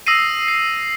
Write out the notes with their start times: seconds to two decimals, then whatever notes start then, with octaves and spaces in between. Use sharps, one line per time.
0.07 D#6 E6 A#6 C7 D#7
0.48 C7